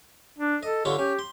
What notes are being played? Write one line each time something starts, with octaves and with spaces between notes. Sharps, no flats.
D4
A4 D#5
D3 F4 G4 C#5
C#4 G4
C6